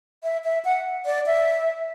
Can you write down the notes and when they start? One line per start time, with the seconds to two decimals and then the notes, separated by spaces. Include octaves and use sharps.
0.23 E5
0.44 E5
0.65 F#5
1.06 D5
1.26 E5